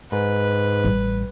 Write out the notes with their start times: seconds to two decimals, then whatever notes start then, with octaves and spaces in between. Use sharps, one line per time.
0.12 G#2 B4
0.84 A1 G3